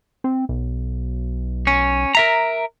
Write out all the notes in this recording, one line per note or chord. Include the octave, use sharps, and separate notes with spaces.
C4
B1
C#4
A#4 E5 A#5